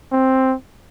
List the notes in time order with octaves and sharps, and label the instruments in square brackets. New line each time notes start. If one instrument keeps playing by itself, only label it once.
[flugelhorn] C4